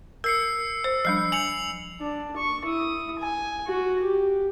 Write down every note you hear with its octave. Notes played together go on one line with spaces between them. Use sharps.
A#4 E6 C7 C#7
C5
F3 G3 D4 C7
G#5 C#7 F7 F#7
D4
C#6
E4 D#6
G#5
F#4
G4